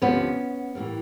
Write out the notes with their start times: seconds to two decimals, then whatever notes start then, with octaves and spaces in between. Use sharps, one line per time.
0.02 D2 C3 F3 B3 C#4
0.75 A2 E3 G3 A#3